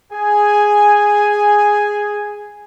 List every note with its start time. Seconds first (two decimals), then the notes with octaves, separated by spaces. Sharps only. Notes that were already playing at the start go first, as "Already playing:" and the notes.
0.12 G#4 G#5